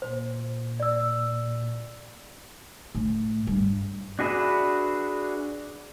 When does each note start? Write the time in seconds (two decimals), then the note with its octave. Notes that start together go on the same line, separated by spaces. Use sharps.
0.02 A#2 C5
0.80 D5 E6
2.95 A2
3.47 G2
4.19 D4 F#4 G#4 B4 E5